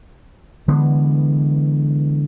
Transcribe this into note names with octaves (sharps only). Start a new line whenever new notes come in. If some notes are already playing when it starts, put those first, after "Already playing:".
D3 E3 G#3 B3